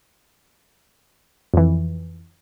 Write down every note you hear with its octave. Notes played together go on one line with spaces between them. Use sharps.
F2 E3